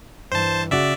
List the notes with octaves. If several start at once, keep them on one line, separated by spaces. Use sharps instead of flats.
G2 E3 C5 A5
C#3 F#4 D5 E5